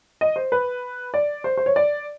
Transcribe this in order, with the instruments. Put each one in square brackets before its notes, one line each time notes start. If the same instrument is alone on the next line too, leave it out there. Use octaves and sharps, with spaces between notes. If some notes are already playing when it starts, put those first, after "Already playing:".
[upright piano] D#5
C5
B4
D5
C5
C5
C#5
D5